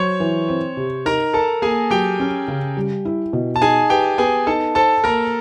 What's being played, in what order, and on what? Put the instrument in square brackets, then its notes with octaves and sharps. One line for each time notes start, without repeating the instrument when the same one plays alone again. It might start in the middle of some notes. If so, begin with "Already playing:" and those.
Already playing: [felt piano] F#3 [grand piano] C5 C#5 C#6
[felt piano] E3
C4
C3
[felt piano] D#4 [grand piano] A#4 A#5
[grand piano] A4 A5 [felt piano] A#4
[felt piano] A#3 [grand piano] G#4 G#5
[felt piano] F#3 [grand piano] G4 G5
[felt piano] C#4
C#3
G3
E4
B2
[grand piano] A5
[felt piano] D#4 [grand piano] G#4 G#5
[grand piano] G4 G5 [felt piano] B4
[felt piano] B3 [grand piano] G#4 G#5
[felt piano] D#4 [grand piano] A4 A5
[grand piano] A4 A5 [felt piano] C5
[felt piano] A#3 [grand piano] A#4 A#5